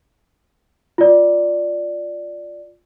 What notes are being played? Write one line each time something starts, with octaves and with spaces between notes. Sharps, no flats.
F4 D5